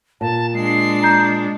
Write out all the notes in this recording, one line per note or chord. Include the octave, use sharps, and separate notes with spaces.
A#2 A5
G#3 D4 C7
A#5 G6